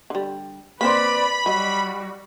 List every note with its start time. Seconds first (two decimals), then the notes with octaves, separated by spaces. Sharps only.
0.10 D3 G3
0.81 A#3 C4 B4 C5 D5 B5
1.46 F#3 G3 F#4 D#5